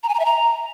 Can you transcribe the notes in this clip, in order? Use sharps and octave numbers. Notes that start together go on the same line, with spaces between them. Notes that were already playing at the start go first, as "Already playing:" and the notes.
A#5
G#5
A#5
E5
A#5